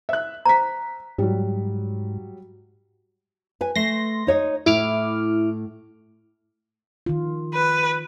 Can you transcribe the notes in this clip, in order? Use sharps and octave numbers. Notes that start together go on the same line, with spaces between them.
E5 F#6
C5 A#5 B6
G#2 F#3 G3
B4 G#5
A3 C6 A#6
D#4 C#5 D#5
A2 E4 D6 F6
D#3 F4
B4